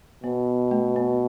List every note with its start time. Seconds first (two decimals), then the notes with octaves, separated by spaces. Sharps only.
0.24 B2 B3
0.71 A3
0.96 B3